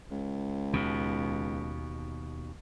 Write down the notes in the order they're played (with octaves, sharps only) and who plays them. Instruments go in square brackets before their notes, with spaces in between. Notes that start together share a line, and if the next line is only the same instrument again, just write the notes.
[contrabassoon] C#2
[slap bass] D#2 B2